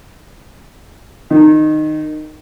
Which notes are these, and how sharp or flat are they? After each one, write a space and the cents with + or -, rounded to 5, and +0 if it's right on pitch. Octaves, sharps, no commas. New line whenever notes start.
D#3 -15